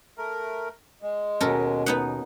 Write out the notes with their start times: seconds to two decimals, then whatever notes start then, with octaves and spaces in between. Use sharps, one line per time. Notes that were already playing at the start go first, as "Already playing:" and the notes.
0.18 A3 A#4
1.02 G#3
1.41 D#2 B2 C#4 A4 A#4
1.86 B3 D#4 F#5